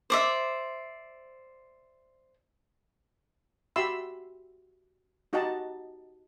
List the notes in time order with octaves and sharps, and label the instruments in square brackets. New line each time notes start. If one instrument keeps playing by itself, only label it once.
[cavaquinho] C5 D5 E5
[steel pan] F#4 G4 E5 B5 C6 E6
D#4 F#4 G4 D#5 F#5 A5